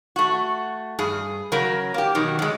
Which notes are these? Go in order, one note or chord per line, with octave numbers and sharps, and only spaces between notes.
A3 F#4
G2 G#4
C#3 F#3 A#4
A#3 G4
B2 D#3 F#3
D3 G#3